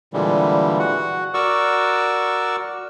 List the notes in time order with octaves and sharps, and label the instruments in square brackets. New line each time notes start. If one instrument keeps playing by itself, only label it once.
[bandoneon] A#2 D3 E3 G3 G#3
F#4 F#5
F#4 A#4 D5 C#6 E6